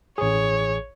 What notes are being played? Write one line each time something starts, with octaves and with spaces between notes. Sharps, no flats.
A1 G#4 C#5